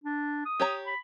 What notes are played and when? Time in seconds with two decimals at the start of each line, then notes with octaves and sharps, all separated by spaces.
0.04 D4
0.45 D#6
0.60 G4 C#5 A#5
0.86 B5